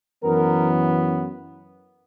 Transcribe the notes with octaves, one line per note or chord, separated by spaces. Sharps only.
F#2 E3 B3 A#4